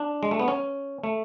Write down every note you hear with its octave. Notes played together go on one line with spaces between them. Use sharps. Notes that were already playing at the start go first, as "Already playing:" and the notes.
Already playing: D4
G#3
A3
B3
C#4
A3